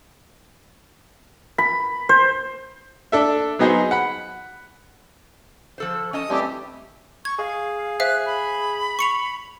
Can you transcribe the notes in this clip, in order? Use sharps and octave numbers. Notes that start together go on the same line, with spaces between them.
B5
C5
D4 A4 E5
F#3 B3 D#4 G#4 C5
F#5 B5
F3 A4 C5
C#4 D#5 A5 D#6
E3 G3 A3 C4 G4
C#6 G#6
G#4 F5
C5 E5 F5 F#6
B5
C#6 C#7 F7